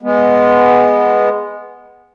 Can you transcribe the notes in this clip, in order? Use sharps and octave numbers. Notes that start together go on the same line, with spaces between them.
G#3 B3